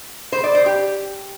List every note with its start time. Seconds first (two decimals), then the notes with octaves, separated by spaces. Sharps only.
0.32 C5
0.44 D5
0.55 C5
0.66 G4